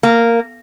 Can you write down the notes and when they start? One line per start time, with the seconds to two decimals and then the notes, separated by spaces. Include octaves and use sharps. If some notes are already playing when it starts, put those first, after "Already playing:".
0.03 A#3